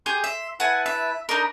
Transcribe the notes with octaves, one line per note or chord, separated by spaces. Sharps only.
G4 G#4 C6 G6
E5
E4 B4 F#5 G#5 A5
E5
D4 D#4 A#4 D#5 B5